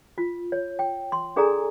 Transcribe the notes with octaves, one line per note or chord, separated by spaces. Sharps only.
F4
C#5
G5
C6
D4 G#4 A4 D5 G#5 A#5